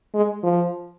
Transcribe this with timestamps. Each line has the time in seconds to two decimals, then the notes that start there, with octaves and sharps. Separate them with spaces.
0.14 G#3
0.43 F3